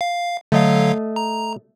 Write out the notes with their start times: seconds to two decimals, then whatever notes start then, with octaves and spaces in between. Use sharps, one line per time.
0.01 F5
0.52 D3 F#3 A3 D#5 F5
1.16 A#5